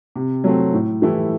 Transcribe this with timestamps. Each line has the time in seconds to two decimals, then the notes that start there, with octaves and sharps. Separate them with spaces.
0.16 C3
0.44 F#3 A3 C4
0.73 A2
1.02 E3 A3 E4 G4